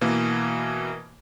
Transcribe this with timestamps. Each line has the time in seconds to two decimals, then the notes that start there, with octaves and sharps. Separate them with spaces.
0.01 B2 E3 A#3